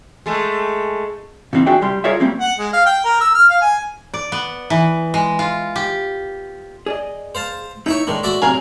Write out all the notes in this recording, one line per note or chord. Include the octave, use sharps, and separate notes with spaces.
G#3 A3
A#2 E3 G3 C4 D#4
D4 F#4 G#4 D5 E5 G5
C2 G3 C6
F4 G#4 A#4 C#5 D5 E5
G3 A3 A#3 C4 C#4
F#5
G#3
F5
G5
A#4
E6
F6
F5
G#5
D5
B3
E3
G#3
F4
G4
G#4 D5 D#5
C5 F5 A5
D#4 E4 C#5 D#5 E5 G5
A2 D#3 G#3 A3 D4
F#4 D5 E5
F#2 A2 C3 G#4 A#4 G#5